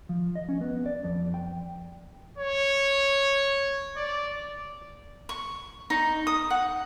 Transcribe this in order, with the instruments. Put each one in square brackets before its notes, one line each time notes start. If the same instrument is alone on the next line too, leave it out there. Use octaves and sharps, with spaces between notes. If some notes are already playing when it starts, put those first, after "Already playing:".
[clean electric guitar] F3
D#5
C#4
B3
D5
F2
G5
[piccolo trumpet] C#5
D5
[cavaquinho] C#6
D#4
D#6
F#5